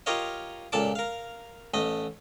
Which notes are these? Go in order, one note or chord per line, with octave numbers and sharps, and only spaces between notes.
F4 G4 A#4 C#5 D#5 F5
C#2 A#2 A4 D5 A5 D6
A#4 F5
A1 A3 D#5